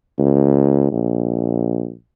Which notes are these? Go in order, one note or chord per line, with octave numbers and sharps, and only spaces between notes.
C#2
A#1